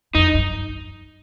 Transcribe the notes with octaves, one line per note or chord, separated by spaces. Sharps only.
F2 D#4
G2